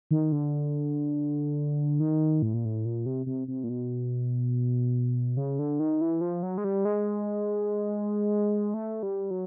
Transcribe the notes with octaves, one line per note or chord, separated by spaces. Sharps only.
D#3
D3
D#3
A2
A#2
A2
A#2
C3
C3
C3
A#2
B2
C#3
D3
D#3
E3
F3
F#3
G#3
G3
G#3
A3
G3
F#3